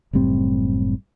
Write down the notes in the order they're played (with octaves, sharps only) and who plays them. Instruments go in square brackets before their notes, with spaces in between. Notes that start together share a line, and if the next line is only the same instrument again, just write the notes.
[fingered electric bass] F#1 A2 G3 C4